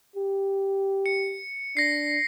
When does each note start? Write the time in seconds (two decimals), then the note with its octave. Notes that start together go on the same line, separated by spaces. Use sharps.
0.16 G4
1.06 C#7
1.77 D4 A#6 C7